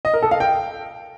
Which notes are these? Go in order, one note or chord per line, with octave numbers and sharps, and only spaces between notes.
D#5
A#4
A4
F5
G5